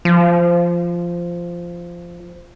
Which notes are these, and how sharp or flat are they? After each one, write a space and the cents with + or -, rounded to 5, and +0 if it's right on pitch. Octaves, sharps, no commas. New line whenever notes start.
F3 -10